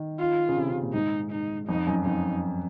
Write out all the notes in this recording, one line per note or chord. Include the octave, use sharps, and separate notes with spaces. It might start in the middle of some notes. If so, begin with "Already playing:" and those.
Already playing: D#3
F4
C#3
C3
C#3
A#2
G#2 D#4
D#4
F2 D#4
F#2
F2 D#4